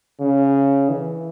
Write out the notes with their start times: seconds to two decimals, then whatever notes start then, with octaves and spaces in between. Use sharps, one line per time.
0.20 C#3
0.89 E3